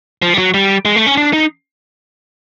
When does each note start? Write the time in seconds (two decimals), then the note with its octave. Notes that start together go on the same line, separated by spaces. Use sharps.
0.22 F3
0.34 G3
0.38 F#3
0.54 G3
0.85 G#3
0.96 A3
1.06 C#4
1.17 D4
1.33 D#4